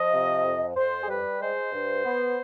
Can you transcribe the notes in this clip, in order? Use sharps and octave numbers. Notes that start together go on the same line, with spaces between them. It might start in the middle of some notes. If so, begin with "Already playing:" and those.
Already playing: F3 D#5
C3
F2
F2 C5
G#4
G3 B4
G#3 C5
G2
B3